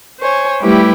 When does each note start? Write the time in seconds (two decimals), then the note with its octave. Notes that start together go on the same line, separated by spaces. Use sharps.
0.20 C5 C#5 G#5
0.61 G3 A3 E4 G4 B4